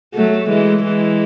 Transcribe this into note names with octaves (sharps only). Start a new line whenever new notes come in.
F#3 A3
E3 G#3
E3 G#3